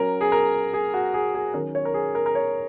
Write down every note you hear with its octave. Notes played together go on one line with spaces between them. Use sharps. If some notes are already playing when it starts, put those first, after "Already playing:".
Already playing: F#3 C#4 A#4
G#4
A#4
G#4
F#4
G#4
G#4
D#3 F#3 C#4 A#4
C#5
A#4
G#4
A#4
A#4
C#5